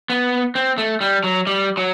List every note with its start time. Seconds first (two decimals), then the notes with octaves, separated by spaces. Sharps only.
0.10 B3
0.55 C4
0.78 A3
1.01 G3
1.24 F#3
1.47 G3
1.77 F#3